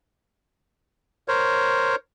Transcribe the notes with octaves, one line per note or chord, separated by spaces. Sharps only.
A#4 C5 C#5